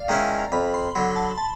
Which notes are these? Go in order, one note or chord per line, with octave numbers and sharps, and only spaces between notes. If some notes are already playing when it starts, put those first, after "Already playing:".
Already playing: D5 F5
D#3 G#3 C#4 E4 A#5
F2 B5
C6
D3 F#3 B5
A5
A5